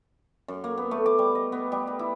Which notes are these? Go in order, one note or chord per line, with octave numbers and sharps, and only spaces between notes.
F#2
A#3
B3
A3
D6
G3
D#5
B3
G3
B4
E4